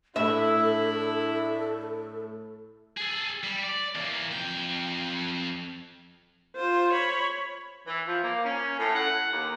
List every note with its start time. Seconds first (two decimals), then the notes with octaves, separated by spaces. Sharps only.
0.16 A2 A3 D4 E4 A4 E5
2.97 G#4 A4
3.43 G3
3.64 D5
3.95 E3 A#3
4.31 F2 G5
6.56 F4 C5
6.93 C#5 B5
7.87 E3
8.06 F3
8.23 A#3
8.45 C#4
8.79 A2
8.94 F#5
9.32 D#2